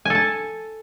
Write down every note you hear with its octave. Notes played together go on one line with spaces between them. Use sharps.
A4 G#5 A5